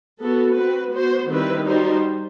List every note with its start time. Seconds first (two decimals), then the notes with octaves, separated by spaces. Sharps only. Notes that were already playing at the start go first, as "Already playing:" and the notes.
0.19 B3 F#4 A4
0.55 C4 F#4 B4
0.92 B3 F#4 C5
1.29 D#3 G3 C4 E4 B4
1.65 G3 D#4 F#4 C5